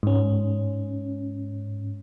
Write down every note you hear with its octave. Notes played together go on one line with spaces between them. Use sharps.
G#2 C#4